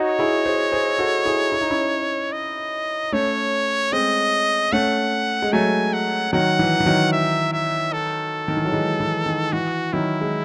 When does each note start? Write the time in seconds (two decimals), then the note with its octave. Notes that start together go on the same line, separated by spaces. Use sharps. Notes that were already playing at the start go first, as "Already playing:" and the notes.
Already playing: D#4 F#4 C#5
0.19 E4 G#4
0.45 G#4 C5
0.72 G#4 C5
0.98 F#4 A4
1.25 E4 G#4
1.52 E4
1.61 D#4
1.70 C#4 E4
2.32 D#5
3.12 A3 C#4 C#5
3.92 G#3 C4 D#5
4.73 A3 C#4 F#5
5.42 G#3
5.52 F#3 A3 G#5
5.93 F#5
6.32 D#3 F#3 F#5
6.59 E3
6.80 E3
6.86 D#3 F#3
7.13 E5
7.53 E5
7.93 A4
8.48 D#3
8.57 E3
8.65 F#3
8.72 E3 G#3
9.00 E3
9.26 D#3
9.53 E3 F#4
9.93 D#3 F#3 E4
10.21 G#3